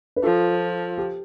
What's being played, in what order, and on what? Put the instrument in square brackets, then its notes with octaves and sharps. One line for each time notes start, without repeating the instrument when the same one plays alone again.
[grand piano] B4
[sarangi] F3 [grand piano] F4 A4
[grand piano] G4